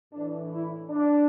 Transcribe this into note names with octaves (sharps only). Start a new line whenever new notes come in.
A2 E3 D4
E4
D4